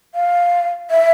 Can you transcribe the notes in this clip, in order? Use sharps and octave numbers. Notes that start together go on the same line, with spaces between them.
F5
E5